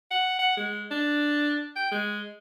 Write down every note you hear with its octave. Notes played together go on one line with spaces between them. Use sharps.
F#5
F#5
G#3
D4
G5
G#3